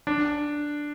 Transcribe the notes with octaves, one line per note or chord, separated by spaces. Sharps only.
D4